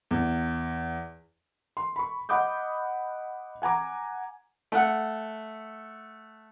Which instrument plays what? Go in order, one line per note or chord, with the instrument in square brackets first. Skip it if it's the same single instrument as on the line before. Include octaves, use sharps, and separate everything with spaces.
[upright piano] E2
[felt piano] C6
B5 C#6
D#5 F#5 B5 D6 D#6 G6
F#5 G#5 A#5 D6
[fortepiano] A3 F#5